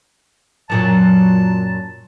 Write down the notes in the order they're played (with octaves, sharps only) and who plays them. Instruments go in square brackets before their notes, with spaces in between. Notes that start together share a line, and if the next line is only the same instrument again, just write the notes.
[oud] F#2 A#2 F#3 [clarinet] A5